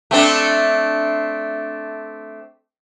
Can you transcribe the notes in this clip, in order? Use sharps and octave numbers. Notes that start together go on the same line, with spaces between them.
A3 C4 D4